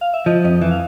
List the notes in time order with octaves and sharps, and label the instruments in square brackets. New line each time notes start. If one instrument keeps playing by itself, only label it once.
[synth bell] F5
E5
[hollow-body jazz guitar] F3 [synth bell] D#5
[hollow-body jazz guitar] F2 [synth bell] D#5
[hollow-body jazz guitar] E3 [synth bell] E5
[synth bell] F5